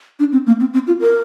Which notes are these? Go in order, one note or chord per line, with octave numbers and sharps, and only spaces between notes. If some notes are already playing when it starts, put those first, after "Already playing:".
D4
C4
A#3
C4
C4
F4
A#4